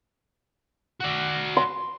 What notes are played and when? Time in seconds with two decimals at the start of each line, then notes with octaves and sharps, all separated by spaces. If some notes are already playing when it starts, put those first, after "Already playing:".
1.01 F#4 D5
1.57 C6